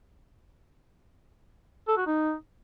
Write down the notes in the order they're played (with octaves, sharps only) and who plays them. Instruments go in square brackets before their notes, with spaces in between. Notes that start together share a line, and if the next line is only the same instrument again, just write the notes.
[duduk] A4
F#4
D#4